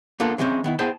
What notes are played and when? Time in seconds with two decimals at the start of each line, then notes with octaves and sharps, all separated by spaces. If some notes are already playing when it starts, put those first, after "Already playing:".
0.20 A#3 B3 D4 F4 A4 A#4
0.38 D3 E3 G#3 A#3 C4 C#4
0.64 D#3 B3 E4
0.79 B3 E4 G#4 C5 G5 A5